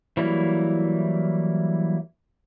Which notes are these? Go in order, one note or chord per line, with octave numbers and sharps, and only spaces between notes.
E3 F#3 G3 A#3 E4